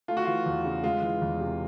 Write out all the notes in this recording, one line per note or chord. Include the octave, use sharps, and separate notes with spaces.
A3 F4
F#4
E3 F4
E2
C#3
G#3 F4
E3
E2
C3